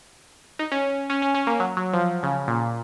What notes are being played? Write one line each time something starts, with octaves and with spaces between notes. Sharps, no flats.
D#4
C#4
C#4
C#4
C#4
A#3
F#3
F#3
F3
C#3
A#2